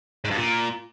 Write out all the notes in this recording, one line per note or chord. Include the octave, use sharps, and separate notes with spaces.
G#2
G2
A#2